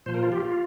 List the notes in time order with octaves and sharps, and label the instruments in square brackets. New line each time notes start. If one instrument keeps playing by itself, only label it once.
[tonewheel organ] A#2 F3 C5
A#4
F4
G4
F4